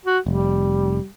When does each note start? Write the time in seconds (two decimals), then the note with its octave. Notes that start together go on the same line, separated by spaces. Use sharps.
0.05 F#4
0.26 F1 G3